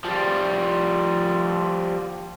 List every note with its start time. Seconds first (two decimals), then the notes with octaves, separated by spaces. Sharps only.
0.05 F3 G3